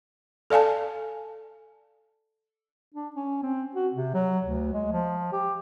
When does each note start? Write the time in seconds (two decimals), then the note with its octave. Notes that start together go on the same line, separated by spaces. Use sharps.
0.50 A4 D5 F5 G#5 A5
2.94 D4
3.16 C#4
3.43 C4
3.75 F#4
3.94 C3
4.14 F#3
4.45 D2
4.73 G#3
4.92 F3
5.33 G4